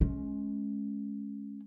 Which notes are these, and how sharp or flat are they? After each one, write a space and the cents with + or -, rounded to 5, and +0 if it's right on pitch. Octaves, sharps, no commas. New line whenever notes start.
G#3 +25 C#4 +0